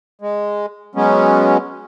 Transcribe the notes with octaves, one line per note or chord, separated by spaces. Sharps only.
G#3
F#3 G#3 B3 C#4